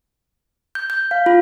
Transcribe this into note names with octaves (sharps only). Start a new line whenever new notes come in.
G6
G6
F5
F4